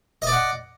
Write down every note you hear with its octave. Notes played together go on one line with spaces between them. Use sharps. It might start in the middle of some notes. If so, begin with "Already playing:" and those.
D5 D#5 F#5